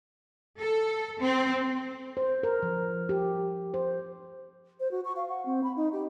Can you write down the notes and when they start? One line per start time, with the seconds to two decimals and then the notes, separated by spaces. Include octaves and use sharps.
0.58 A4
1.20 C4
2.17 C5
2.43 A#4
2.62 F3
3.09 G4
3.74 C5
4.80 C5
4.91 F#4
5.05 C#6
5.16 F5
5.29 F#5
5.46 C4
5.63 B5
5.76 D#4
5.93 G4